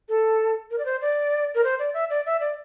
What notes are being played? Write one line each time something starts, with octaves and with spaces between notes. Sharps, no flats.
A4
A#4
D5
C5
D5
A#4
C5
D5
E5
D5
E5
D5